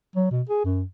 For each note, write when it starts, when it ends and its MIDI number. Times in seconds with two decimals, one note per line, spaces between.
0.16 0.31 54
0.31 0.42 47
0.49 0.60 68
0.65 0.83 42